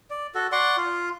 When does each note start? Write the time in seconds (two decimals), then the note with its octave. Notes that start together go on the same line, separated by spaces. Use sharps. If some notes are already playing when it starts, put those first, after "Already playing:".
0.10 D5
0.35 F#4 A4
0.52 D5 F#5 C6 C#6
0.77 F4